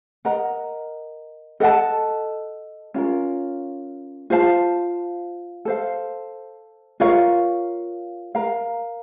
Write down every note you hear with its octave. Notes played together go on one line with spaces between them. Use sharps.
A#4 D#5 F#5 A#5
A4 D#5 F#5 A5
C#4 F4 A#4
F4 C5 F5 A5
A4 C5 F5
F4 A#4 C#5 F5
A#4 F5 A#5